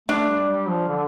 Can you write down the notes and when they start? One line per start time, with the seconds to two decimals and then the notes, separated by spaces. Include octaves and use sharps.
0.08 A3 D4
0.29 G3
0.48 G3
0.68 F3
0.88 D3